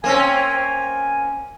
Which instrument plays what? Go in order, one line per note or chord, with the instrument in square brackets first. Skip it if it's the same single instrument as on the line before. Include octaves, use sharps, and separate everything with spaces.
[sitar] A#3 C4 C#4 [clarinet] G#5